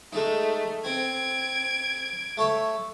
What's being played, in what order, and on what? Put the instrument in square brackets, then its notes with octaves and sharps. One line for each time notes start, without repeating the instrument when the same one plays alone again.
[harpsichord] G#3 D#4 [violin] A3
[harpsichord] C4 [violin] G#6 D7
[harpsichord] A3 C#5 E5